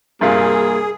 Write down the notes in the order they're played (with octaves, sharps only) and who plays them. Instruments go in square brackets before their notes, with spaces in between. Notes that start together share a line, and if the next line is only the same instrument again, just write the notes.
[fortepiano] G2 C3 F4 [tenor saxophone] A#3 [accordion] G#4